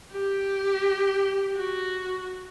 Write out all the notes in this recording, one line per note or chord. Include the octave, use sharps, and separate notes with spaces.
G4
F#4